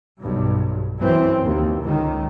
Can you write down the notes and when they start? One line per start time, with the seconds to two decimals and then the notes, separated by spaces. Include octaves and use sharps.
0.19 B1 G2
0.99 F#2 E3 C4
1.45 D#2
1.81 C#2 D#3